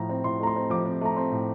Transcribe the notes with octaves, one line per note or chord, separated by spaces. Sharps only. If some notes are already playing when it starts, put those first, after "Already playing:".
Already playing: A2 F3 A#5
C4
A2 C6
A3 A#5
C6
C4
F3 D6
C4
A3 A#5
C4 C6
A2